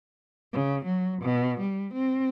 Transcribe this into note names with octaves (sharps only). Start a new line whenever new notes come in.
C#3
F#3
B2
G3
C4